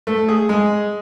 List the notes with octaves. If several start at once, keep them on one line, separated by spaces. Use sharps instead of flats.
A3
G#4
G#3